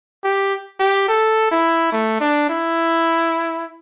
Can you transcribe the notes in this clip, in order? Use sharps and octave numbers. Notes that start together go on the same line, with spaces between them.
G4
G4
A4
E4
A3
D4
E4